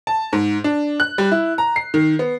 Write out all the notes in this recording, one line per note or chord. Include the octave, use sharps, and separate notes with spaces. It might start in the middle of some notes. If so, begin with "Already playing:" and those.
A5
G#2
D4
F#6
G3
E4
A#5
C7
D#3
B3